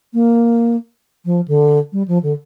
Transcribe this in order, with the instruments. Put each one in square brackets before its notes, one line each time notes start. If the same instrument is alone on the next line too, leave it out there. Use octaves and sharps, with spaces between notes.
[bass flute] A#3
F3
D3
G3
F3
D3